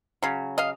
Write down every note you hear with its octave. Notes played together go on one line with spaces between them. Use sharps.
C#3 F#3
D#5 F5